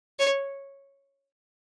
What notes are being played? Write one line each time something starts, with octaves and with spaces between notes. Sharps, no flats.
C#5